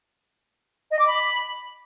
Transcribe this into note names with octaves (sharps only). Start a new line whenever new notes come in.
D#5
D6
B5